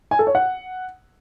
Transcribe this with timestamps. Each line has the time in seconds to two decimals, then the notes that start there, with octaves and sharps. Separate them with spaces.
0.11 G#5
0.19 A4
0.27 C#5
0.35 F#5